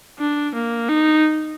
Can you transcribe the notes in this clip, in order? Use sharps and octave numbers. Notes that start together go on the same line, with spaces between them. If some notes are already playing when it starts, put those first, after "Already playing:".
D4
A#3
D#4